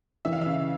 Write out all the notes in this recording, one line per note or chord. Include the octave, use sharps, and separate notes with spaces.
E3 E5
F5
E5
C#3